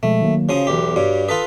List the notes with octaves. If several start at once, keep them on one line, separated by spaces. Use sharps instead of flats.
B2 F3 G#3 A3
D#3 F#3 A#3
C#3 F3 F#4 D#6
B1 E2 G4
G2 G3 F#4 G4 C#5
F4 A4 B4 D#6